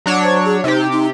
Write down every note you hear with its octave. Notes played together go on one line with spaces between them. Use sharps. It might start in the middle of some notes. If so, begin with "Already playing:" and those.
F#3 D4 C#5
C5
G#4
C3 D#4 G4
D#4